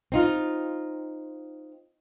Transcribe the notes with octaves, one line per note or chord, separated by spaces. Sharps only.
C4 D#4 F4